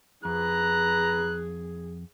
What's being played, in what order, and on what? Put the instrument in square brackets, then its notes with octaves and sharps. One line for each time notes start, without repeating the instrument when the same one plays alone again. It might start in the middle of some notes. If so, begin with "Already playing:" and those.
[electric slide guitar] F2 [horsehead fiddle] G#4 [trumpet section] B4 A#5 [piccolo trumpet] F#6